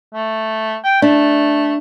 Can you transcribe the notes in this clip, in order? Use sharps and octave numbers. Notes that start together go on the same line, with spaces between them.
A3
G5
A3 D4